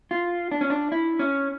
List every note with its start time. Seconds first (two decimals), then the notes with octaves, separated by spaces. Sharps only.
0.11 F4
0.52 D4
0.61 C#4
0.70 D4
0.92 E4
1.19 C#4